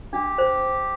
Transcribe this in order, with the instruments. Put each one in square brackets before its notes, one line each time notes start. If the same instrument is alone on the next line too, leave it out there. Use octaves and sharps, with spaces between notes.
[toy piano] D4 [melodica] G4
[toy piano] C5